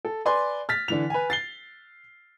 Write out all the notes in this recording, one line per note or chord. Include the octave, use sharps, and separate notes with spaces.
A4
B4 D5 G#5 C6
F6 A6 B6
D3 E3 F7
B4 G#5
A6 C7 G7